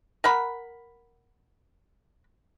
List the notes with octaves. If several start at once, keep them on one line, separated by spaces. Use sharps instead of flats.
A#4 F#5 B5